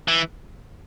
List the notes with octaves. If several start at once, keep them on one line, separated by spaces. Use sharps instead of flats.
E3